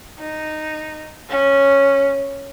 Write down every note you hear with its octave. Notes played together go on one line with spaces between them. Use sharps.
D#4
C#4